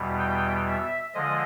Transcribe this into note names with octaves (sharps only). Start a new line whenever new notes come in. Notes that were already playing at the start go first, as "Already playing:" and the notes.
Already playing: E2 B2 G3
G5
E5
D3 F3 G#3 D#5